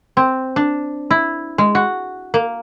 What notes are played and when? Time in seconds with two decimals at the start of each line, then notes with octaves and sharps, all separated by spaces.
0.17 C4
0.56 D4
1.11 E4
1.58 G#3
1.75 F#4
2.34 A#3